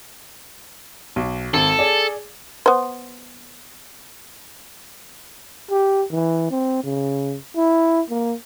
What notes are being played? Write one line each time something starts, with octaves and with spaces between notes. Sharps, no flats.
B1
G#1 A4
G#4 D5
B3 C5
G4
E3
C4
C#3
E4
A#3